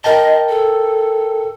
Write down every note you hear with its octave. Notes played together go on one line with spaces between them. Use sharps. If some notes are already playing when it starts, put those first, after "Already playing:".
A#4 D#5 G5 A5
A4